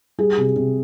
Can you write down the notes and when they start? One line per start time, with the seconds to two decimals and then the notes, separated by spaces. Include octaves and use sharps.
0.18 G3 G#4
0.37 C3
0.56 C3